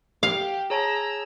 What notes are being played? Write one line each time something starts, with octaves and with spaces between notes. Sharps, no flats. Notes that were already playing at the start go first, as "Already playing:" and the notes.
G4 F5
G#4 C#5 A5 A#5 E6